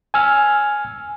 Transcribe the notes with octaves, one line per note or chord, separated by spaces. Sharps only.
G#5 E6 F6